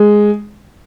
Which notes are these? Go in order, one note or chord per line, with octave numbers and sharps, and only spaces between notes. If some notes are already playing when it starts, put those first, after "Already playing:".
Already playing: G#3